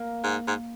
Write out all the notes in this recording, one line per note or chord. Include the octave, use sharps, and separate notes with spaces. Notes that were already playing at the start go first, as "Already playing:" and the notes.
Already playing: A#3
G#2
G#2